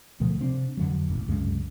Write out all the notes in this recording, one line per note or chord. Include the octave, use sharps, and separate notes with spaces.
D2 B2 F3
C3 C4 D4
F2 D3 F#3
E1 A1
C2 F#2 C#3 G#3